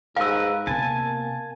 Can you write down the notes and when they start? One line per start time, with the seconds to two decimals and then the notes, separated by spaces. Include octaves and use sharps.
0.16 G#2 A#4 B4 F5 E6
0.67 C3 A#3 B3 G#5 A5